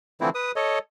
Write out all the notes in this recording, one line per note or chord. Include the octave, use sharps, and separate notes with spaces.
D3 E3 F3 A3 C4 E4
B4 D#6
A4 C#5 D#5